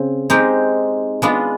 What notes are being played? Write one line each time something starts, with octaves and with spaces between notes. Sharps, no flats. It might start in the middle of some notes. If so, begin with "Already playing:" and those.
Already playing: C#3 C4
G#3 C4 D#4 G4
G#3 B3 D4 F4